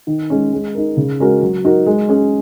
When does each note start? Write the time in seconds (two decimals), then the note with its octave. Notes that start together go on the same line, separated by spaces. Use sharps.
0.07 D#3
0.30 G#3 C#4
0.53 G#3
0.75 D#4 A#4
0.97 C#3
1.20 G#3 C#4 F#4 A#4
1.42 F#3
1.65 D#4 F#4 A#4
1.86 G#3
2.09 C#4 G#4